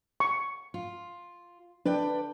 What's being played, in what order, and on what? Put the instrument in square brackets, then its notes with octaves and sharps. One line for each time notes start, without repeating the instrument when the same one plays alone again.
[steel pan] C#6
[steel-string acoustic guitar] F4
[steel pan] D4 [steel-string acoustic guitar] B4 D5 G5